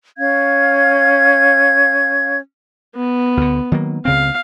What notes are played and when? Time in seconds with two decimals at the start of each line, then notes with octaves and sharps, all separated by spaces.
0.17 C#4 F5 G#6
2.96 B3
3.37 D2 D3
3.72 D#3 F#3 A#3
4.05 C#2 C#3 C4 F5